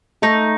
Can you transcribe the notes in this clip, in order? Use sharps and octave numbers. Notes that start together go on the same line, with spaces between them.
A3 D#4